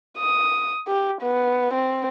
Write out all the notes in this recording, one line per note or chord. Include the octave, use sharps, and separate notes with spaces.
D#6
G4
B3
C4